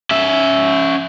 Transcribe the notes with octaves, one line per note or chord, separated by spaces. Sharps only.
C#4 E5